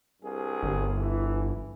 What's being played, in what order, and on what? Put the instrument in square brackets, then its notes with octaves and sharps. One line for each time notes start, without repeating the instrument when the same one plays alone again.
[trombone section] C2 G2 G#4
[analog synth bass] G1
[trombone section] E3